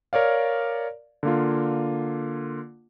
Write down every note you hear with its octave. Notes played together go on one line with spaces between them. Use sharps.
A#4 C#5 D5 F5
D3 A#3 F4